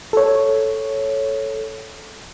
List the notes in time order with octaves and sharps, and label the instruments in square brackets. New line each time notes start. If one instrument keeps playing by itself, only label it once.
[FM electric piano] A4 C#5